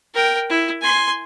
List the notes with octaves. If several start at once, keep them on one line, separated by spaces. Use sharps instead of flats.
A#4 G5
E4
G#5 C6